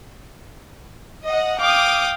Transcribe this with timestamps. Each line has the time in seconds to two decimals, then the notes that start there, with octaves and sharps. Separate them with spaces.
1.23 D#5 F#5
1.60 F5 G5 D6 D#6 D7